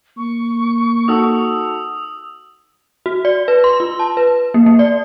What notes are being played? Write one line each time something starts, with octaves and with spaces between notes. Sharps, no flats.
A#3 C#6
D#4 F#4 A4 D#6 E6
F#4
D5
B4
C6
F4
A5
B4
A#3
A#3
D5